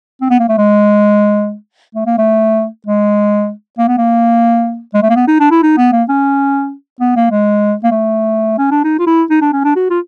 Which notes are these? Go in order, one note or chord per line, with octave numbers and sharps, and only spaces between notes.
C4
B3
A#3
A3
G#3
A3
A#3
A3
G#3
A#3
B3
A#3
G#3
A3
A#3
B3
D#4
D4
E4
D#4
B3
A#3
C#4
B3
A#3
G#3
A#3
A3
C#4
D4
D#4
F4
E4
D#4
D4
C#4
D4
F#4
F4